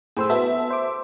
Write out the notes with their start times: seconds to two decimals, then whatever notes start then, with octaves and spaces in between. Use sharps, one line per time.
0.17 A2 G#4 C5 E6
0.30 B3 F#4 A4 E5
0.70 C5 D6